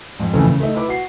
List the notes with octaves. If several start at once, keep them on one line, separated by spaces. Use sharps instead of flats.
F2 G#2
F2 C#3 E3 A3
C#3
A3 D#4
E4 B4 D6
F#4 C7